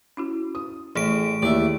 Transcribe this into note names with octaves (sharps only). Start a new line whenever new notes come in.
C#4 E4 F#4
D#6
A1 A3 G#4 D7
D#2 D#3 E4 D5 E5